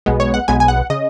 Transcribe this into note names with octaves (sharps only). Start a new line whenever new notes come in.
B1 B2 G#3 B3
C#5
F#5
B1 B2 G#3 B3 G#5
G#5
F#5
C#3 D#5